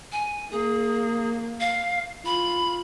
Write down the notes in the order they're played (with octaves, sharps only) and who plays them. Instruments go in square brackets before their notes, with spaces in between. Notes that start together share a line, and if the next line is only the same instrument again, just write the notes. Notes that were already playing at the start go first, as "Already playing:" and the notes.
[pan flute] G#5
[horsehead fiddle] A#3 [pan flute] G#4
[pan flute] F5
[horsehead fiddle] F4 [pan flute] B5